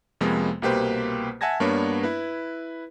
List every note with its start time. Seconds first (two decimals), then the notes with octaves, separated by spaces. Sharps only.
0.21 F2 C3 F3 G#3 A#3 B3
0.62 C2 B2 A#3 G4 B4 C5
1.41 E5 F#5 G#5 A5 G#6 A#6
1.60 G2 A#3 B3 D4 C#5
2.03 E4 B4